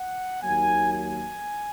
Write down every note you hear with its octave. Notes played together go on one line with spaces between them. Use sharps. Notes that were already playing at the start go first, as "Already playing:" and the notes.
Already playing: F#5
D#2 D#3 F#3 A#3 G#5
G#5